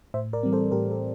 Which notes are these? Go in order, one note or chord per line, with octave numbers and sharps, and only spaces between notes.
A2 C5 E5
A#4 D5
E3 G3 C4
A4 C5
A2 G4 A#4
A4